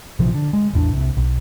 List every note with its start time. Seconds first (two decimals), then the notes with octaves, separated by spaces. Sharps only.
0.19 A#1 C3 E3 F3
0.34 D3
0.53 G#3
0.73 A1 E2 C4 D4
0.92 C2 C3
1.17 B1